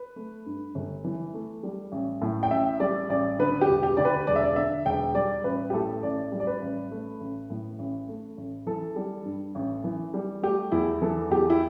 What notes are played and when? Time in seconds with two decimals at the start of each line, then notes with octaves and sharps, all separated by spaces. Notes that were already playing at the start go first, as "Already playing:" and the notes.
Already playing: B4
0.16 A3
0.46 G2
0.75 G1
1.04 E3
1.34 A3
1.63 G3
1.92 A1
2.22 A2
2.43 G5
2.51 A1 E5
2.80 G3 D5
3.09 A1 D5
3.39 D3 B4
3.61 G4
3.69 E1
3.83 G4
3.97 D2 D5
4.05 B4
4.27 E1 D5
4.36 E5
4.43 D5
4.56 D3 E5
4.85 E1 G5
5.15 G3 D5
5.44 A1 B4
5.70 G4
5.73 A2 A4
6.03 A1 D5
6.32 G3
6.40 D5
6.47 B4
6.62 A1
6.91 A3
7.20 A1
7.50 A2
7.79 A1
8.09 A3
8.37 A1
8.66 E3 A4
8.96 G3
9.25 G2
9.55 A1
9.84 E3
10.14 G3
10.43 A3 G4
10.72 E2 E4
11.02 E3 A4
11.30 E2 G4
11.50 E4